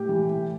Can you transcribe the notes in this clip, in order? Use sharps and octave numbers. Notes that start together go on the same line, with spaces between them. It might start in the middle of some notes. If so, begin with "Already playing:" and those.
Already playing: A2 G4
E3
A2